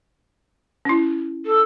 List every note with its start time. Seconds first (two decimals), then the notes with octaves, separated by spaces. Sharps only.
0.85 C#4 E4
1.46 A4